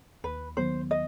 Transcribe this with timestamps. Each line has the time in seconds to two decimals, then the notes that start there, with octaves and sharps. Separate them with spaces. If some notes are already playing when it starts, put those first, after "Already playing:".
0.24 D#2 B4
0.57 D#3 F#3 B3 C5
0.91 D#5